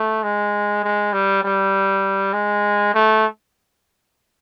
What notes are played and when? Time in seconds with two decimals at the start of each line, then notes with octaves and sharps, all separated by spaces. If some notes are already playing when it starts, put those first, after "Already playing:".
Already playing: A3
0.23 G#3
0.84 G#3
1.13 G3
1.44 G3
2.33 G#3
2.95 A3